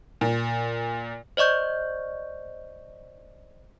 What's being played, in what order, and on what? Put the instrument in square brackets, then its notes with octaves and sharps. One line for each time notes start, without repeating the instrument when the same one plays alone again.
[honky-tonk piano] A#2
[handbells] C5 D5 D#5 C#6 G6